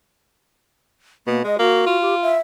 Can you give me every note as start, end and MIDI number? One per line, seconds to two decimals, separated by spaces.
1.27 1.40 47
1.27 1.41 58
1.44 1.55 56
1.44 1.56 75
1.59 1.83 58
1.59 2.01 66
1.86 2.35 65
2.02 2.15 67
2.22 2.38 76